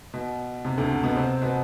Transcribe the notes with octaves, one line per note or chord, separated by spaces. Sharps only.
B2
C3
D2 D3
C3
B2 B3
C3 C4
B2 B3